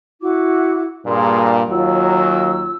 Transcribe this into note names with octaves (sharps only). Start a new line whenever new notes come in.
E4 F#4 D6
G2 A#2 G#4 C6
D#2 F#3 F4 E6